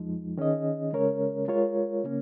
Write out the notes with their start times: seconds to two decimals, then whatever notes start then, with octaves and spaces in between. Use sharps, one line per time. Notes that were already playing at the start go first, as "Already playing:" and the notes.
Already playing: F2 F3 G#3 D#4
0.37 D#3 C#4 G#4 D#5
0.93 C#3 G#3 C#4 A#4 C#5
1.48 G#3 F4 A#4 C#5
2.04 C#3 A#3 C#4